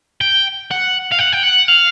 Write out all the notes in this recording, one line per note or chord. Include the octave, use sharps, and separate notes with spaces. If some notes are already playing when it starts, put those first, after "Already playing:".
G5
F#5
F5
F#5
G5
F#5
F5